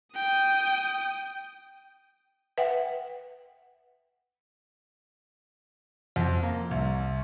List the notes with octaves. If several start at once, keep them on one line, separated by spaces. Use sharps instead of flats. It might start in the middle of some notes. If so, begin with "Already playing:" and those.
G5 D#6
B4 E5 F#5 G5
F2
A#3
C2